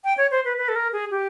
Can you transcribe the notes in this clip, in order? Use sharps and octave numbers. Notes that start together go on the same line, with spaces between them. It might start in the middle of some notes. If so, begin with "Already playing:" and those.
G5
C#5
C5
B4
B4
A4
A#4
G#4
G4